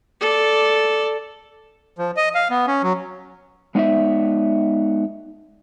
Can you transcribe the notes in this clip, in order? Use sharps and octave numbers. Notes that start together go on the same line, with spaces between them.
A4 D5
F3
D#5
F5
B3
C#4
F#3
G#3 B3 D#4 C#5 D5 E5